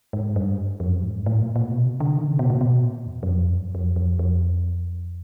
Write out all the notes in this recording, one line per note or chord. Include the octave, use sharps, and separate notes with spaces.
G#2
G2
F2
F#2
F2
G#2
A2
A#2
A#2
B2
C3
D3
D#3
C#3
B2
A#2
B2
A#2
E2
F#2
F2
F#2
F2
F2
F2